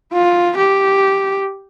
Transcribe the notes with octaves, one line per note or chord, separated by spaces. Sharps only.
F4
G4